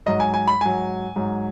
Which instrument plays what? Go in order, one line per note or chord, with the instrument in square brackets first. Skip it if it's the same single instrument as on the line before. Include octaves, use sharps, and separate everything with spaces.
[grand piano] G#2 F#3 D#5
G#5
G#5
B5
G#2 F#3 G#5
G#2 F#3